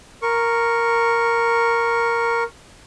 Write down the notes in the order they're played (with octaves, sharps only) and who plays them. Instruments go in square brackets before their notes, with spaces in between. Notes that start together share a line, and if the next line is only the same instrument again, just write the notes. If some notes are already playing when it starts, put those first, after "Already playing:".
[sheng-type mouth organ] A#4 C#6